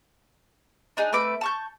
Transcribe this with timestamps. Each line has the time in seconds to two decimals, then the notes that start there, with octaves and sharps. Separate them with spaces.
0.97 D4 D#4 G#4
1.13 A3 C4 B4 D6
1.41 A5 C#6 G6